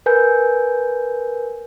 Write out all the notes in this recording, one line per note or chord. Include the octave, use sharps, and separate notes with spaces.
A#4 B4 G#5 G6